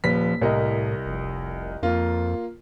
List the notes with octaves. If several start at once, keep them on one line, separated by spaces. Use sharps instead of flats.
D#1 F3 B4 B6
C2 A2 A#4 D#5
F1
F2 A#3 F4